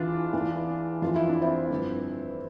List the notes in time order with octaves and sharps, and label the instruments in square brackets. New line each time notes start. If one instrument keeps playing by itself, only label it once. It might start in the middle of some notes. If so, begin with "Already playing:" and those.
Already playing: [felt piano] E2 E3 D4 F4
E2 E3
F2 E3 F4
E4
D4
C4 E4
G2 D3 F3